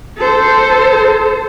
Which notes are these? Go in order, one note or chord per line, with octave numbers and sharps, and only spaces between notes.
A4 C5